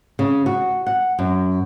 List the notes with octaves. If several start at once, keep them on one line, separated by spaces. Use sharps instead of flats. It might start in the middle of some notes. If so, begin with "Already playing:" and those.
C#3
F#4
F#5
F#2